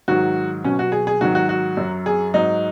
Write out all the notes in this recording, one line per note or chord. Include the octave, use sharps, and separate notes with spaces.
G#2 D#3 F#3 F#4
B2 F#3 C#4
F#4
G#4
G#4
G#2 D#3 F#3 F#4
F#4
F#4
F#2 F#3
G#4
G#2 F#3 D#4